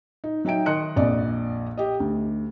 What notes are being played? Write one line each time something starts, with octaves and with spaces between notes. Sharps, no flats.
D#4
F#3 D#4 E5 G5 D7
D#3 D#5 C6 F#6 C#7
A#1 F2 D5 D#5
G4 D#5
D2